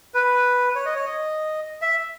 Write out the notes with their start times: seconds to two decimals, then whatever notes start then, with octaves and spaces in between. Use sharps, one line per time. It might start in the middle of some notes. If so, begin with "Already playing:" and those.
0.14 B4
0.75 C#5
0.85 D#5
0.95 C#5
1.06 D#5
1.81 E5